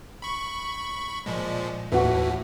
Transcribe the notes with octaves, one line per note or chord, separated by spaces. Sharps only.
B5 C#6
A#2 F3 G#3
D#2 A2 E3 A3 F#4